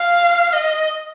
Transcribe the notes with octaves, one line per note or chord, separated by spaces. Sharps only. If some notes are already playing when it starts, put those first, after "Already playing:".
Already playing: F5
D#5